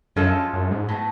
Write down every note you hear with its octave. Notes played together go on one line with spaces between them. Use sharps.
F#2 F3 G#3 C#4 F4 A4
F#2
G#2
A2 F#3 B3